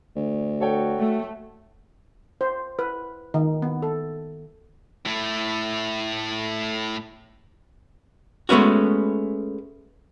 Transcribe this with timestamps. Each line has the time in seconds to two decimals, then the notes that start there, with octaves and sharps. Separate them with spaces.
0.16 D2
0.61 F#4 A4 C#5 G5
0.99 A3
2.41 C5
2.79 B4
3.34 D#3
3.62 B3
3.82 A4
5.06 A2 A3
8.49 G#3 A3 B3 C#4 F#4